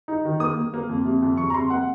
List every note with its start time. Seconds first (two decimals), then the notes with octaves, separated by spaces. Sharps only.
0.08 D#4
0.25 D#3
0.40 A#3 D#6
0.56 A#3
0.74 A#3
0.89 F2
1.05 C3
1.22 F2
1.37 F2 C#6
1.50 A#5
1.54 C3 C6
1.70 A#3 F#5